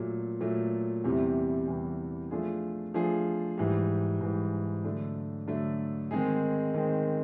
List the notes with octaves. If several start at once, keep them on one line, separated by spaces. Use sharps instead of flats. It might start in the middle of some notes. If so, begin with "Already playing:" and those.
Already playing: A#2 F#3 A3
A#2 F#3 A3
E2 C3 E3 G3
E2 C3 E3 G3
F3 A3 D4 F4 G#4
F3 A3 D4 F4 G#4
G#2 E3 G3
G#2 E3 G3
D3 F#3 A3 D4
D3 F#3 A3 D4
D#3 G#3 C4 D#4 G#4
D#3 G#3 C4 D#4 G#4